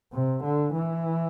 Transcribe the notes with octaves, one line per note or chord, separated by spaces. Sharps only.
C3
D3
E3